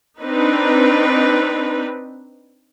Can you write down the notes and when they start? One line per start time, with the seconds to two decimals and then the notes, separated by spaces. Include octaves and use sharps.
0.19 C4 D4 D#4 B4